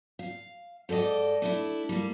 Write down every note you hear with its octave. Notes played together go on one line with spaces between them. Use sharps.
F5
G#2 A4 D5 D#5 G5
A3 D4 E4
G3 A#3